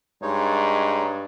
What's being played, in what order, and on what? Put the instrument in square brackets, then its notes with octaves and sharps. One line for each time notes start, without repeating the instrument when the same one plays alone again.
[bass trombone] G2 [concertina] G#3 D#4 C#5